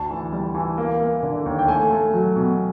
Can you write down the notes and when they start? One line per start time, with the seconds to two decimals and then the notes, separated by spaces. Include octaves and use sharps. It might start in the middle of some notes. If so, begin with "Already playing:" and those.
Already playing: D2 A5
0.10 E3
0.32 G3
0.55 E3
0.78 A#3
1.00 A#3
1.23 D3
1.46 D#2
1.59 G5
1.68 A3 G#5
1.91 A3
2.14 F#3
2.36 B2